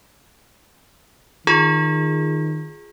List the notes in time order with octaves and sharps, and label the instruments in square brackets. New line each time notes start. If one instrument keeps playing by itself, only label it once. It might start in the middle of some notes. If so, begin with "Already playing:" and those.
[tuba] D#3 [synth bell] F4 G#4